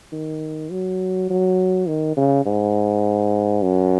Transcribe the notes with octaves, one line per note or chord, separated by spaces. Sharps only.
D#3
F#3
F#3
D#3
C#3
G#2
F#2